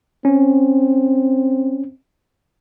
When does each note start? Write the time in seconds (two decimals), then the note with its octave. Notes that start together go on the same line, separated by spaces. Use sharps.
0.25 C4 C#4